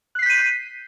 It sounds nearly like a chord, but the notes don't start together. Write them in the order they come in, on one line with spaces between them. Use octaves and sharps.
F#6 C7 B6 G6 D#7